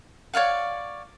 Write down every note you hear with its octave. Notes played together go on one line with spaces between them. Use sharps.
C#5 D5 F5 F#5